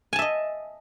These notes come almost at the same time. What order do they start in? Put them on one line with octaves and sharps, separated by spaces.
G#5 A5 E5 D#5